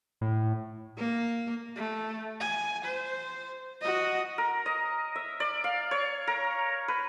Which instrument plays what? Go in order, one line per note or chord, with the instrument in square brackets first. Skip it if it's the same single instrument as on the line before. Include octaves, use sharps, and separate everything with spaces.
[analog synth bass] A2
[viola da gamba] A#3
[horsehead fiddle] A3
G#5
C5
F#4 D#5
[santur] A#4
D#5
E5
D5
F5
C#5
A#4
B4